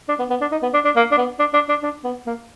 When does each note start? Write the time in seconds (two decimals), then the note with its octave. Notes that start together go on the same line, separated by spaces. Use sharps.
0.09 D4
0.19 B3
0.30 B3
0.41 D4
0.52 D#4
0.63 B3
0.74 D4
0.85 D4
0.96 A#3
1.12 D4
1.18 B3
1.39 D4
1.54 D4
1.69 D4
1.83 D4
2.04 B3
2.27 A#3